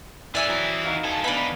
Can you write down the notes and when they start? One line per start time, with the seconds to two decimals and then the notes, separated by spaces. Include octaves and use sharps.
0.35 E3 C#4 A4 D5 E5 G#5
0.49 F#3 C4 E4 D#6
0.83 D#4 F#4 F5
1.04 D2 F3 A4 G#5 A5
1.24 B3 D4 D#4 D5 B5